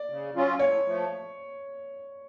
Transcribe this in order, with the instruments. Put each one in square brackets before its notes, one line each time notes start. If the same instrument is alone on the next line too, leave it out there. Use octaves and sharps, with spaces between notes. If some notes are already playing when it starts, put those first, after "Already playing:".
Already playing: [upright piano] D5
[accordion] C#3
F#3 C#4 F4
[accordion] A2 [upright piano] C#5
[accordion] F3 A3